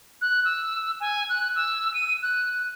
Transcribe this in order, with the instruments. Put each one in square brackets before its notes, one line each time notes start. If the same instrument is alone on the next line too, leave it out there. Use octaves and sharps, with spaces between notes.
[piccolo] F#6
E6
G#5
F#6
E6
D#7
F#6